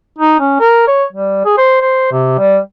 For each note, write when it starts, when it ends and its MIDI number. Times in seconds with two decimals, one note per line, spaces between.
0.18 0.37 63
0.40 0.59 61
0.60 0.83 70
0.88 1.04 73
1.13 1.45 55
1.45 1.56 68
1.58 1.78 72
1.81 2.07 72
2.12 2.34 48
2.38 2.58 55